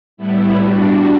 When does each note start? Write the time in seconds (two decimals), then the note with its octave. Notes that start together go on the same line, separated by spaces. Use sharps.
0.17 A2 G3 B3 E4
0.56 G3 D4 F#4